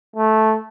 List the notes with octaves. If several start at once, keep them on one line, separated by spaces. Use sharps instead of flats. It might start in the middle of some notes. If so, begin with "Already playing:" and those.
A3